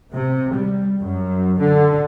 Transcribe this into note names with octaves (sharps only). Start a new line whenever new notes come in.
C3
G3
F#2
D3